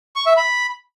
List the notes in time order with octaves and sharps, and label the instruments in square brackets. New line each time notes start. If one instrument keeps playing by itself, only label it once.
[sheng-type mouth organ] C#6
E5
B5